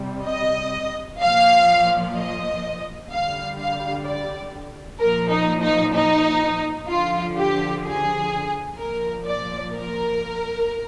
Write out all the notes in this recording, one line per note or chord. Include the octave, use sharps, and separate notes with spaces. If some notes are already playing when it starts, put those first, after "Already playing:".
Already playing: C3 G3
D#5
A#2 F3 F5
D#5
D3 G3 F5
F5
D5
A#2 F3 A#4
D#4
D#4
D#4
D3 F3 F4
G4
G#4
A#2 F3 A#4
D5
A#4